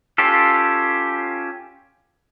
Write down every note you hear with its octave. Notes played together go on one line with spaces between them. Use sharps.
C#4 F4 G4 A4